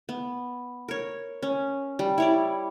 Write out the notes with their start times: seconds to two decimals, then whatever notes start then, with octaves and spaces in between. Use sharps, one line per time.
0.09 B3
0.88 A#4 C#5
1.43 C#4
1.99 G3
2.18 E4 C#5 D5